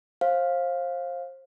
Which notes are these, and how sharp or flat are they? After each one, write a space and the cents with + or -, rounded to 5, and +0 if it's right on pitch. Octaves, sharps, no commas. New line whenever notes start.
C5 +30 F5 +5